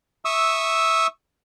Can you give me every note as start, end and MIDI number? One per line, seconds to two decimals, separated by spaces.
0.25 1.07 76
0.25 1.07 85
0.25 1.07 87
0.25 1.07 88